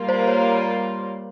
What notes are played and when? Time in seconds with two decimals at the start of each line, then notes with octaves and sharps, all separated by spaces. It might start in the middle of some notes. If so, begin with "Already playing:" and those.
Already playing: G3 A#3 F4
0.09 C5
0.27 C#5